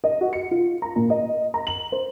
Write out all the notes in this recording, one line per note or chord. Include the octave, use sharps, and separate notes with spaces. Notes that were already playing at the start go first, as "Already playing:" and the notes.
D#5
F#4
C#7
F4
A#5
A#2
D#5
A#5
F#7
C5